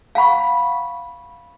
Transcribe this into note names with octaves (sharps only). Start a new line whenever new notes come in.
F5 F#5 B5 C#6